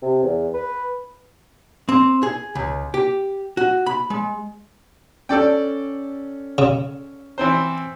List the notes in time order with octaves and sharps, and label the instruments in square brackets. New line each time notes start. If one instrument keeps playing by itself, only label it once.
[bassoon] C3
E2
B4
[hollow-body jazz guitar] C4
G#4
C#2
G4
F#4
B5
G#3
[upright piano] C#4 [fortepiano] A4 D5 G5
[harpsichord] C#3
[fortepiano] E3 C4 C5